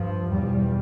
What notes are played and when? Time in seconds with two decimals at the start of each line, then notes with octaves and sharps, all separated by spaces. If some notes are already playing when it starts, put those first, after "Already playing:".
Already playing: G2 F3
0.30 E2 B2 G3